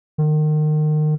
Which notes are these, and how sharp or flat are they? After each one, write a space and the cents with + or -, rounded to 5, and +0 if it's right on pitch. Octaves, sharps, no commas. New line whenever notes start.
D#3 -30